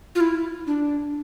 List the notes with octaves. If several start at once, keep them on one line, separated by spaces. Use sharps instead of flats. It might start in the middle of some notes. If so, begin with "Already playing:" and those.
F4
E4
D4